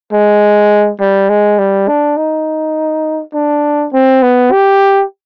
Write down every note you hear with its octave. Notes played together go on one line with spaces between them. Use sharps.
G#3
G3
G#3
G3
D4
D#4
D4
C4
B3
G4